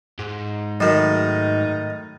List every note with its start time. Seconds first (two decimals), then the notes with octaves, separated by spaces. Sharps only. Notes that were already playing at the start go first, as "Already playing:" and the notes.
0.19 G#2
0.80 A2 D#3 F#3 D#4 F#4